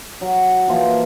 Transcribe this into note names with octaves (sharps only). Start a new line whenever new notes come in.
F#3
E3 F3 A#3 F4